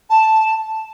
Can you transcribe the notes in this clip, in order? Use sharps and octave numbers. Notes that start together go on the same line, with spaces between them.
A5